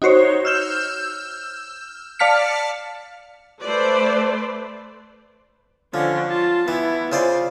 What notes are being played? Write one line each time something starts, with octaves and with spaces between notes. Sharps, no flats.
D#4 F#4 C5 C#5
E6 F6 G6 E7
D5 F5 A5 F6 B6 C#7
A3 B4 C5 D5
D3 F3 C#4
F4 A5
E3 B3 E4
C#3 F4 C5 D5